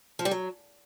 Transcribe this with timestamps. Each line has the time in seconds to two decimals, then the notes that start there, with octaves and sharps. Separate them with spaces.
0.19 F3
0.25 G3
0.31 F#3